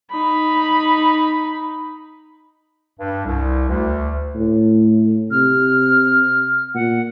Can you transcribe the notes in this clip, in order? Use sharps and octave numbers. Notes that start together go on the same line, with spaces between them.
D#4 B5
G2
C2
D2
A2
C3 F6
A#2 F#5